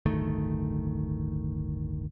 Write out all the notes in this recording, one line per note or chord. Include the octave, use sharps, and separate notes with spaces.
D1 G1 D#3 A3